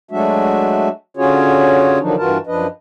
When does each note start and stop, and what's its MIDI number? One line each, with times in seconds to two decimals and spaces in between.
0.11 0.89 54
0.11 0.89 56
0.11 0.89 57
0.11 0.89 62
0.11 0.89 66
0.11 0.89 76
1.17 1.99 50
1.17 1.99 61
1.17 1.99 65
1.17 1.99 66
1.17 1.99 68
1.17 1.99 73
2.00 2.15 50
2.00 2.15 51
2.00 2.15 53
2.00 2.15 54
2.00 2.15 62
2.00 2.15 63
2.18 2.38 43
2.18 2.38 52
2.18 2.38 65
2.18 2.38 66
2.18 2.38 70
2.18 2.38 81
2.47 2.67 42
2.47 2.67 53
2.47 2.67 62
2.47 2.67 71
2.47 2.67 75